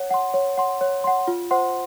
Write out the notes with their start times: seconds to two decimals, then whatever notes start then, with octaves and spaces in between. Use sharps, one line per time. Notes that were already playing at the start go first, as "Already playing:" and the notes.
Already playing: C#5 F#5
0.11 F#5 C6
0.34 C#5
0.57 F#5 C6
0.81 C#5
1.04 F#5 C6
1.28 F4
1.51 C5 F#5 C6